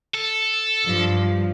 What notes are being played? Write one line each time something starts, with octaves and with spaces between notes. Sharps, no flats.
A4
G2 F3